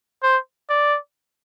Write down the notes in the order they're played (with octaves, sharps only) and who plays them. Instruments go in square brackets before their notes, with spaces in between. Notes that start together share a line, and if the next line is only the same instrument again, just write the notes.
[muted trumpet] C5
D5